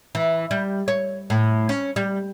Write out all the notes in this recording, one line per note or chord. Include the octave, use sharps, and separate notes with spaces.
E3
G3
C#5
A2
C#4
G3